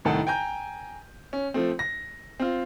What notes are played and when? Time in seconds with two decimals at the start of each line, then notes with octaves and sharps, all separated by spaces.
0.05 C2 A2 D#3 A4 F#5 A5
0.27 G5 G#5 A#5 G6
1.33 C#4
1.54 F3 A3 C4
1.79 A#6
2.40 C4 F4